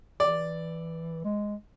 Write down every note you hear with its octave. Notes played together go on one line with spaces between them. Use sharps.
E3 D5
G#3